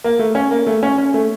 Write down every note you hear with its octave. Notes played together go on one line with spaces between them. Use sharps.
A#3
A3
C#4
A#3
A3
C#4
C#4
A3